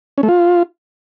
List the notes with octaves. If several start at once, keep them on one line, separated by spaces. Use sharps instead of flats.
C#4
A3
F4